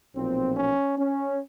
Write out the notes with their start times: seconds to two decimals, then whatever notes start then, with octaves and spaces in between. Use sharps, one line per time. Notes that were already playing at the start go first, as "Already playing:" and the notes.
0.14 B1 A#2 F3 C4
0.55 C#4
0.96 C#4